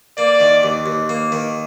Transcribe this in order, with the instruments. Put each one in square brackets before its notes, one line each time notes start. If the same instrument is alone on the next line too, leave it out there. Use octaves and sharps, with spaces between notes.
[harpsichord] A#3 [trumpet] D5
[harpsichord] D#3
D#2
D#2
A#3
D#3